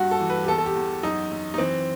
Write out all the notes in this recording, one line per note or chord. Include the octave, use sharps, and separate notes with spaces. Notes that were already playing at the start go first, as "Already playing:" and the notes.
Already playing: G2 F#4
A4
E3
B4
G4
E2 A4
A4
G4
E2
F#2 D#4
F#2
D#4
E3 C4